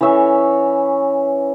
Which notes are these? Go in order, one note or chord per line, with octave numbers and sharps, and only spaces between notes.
E3 C#4 C#5 E5